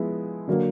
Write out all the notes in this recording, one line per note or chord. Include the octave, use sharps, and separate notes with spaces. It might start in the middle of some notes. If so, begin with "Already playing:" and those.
Already playing: F3 G#3 B3 E4
D3 F#3 A#3